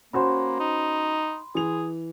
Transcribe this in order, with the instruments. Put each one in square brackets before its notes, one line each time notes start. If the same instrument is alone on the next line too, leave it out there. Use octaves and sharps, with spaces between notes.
[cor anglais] A#3 [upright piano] C#4 F#4 C5 [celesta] B5 C6
[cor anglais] D#4
[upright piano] E3 F7 [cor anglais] G#4